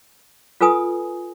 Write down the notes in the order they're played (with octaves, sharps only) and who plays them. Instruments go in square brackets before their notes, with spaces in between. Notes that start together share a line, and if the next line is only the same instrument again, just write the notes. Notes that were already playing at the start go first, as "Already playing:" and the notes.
[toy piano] F4 A4 B4 G#5 D#6